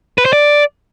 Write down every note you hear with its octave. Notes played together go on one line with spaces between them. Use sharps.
B4
C5
D5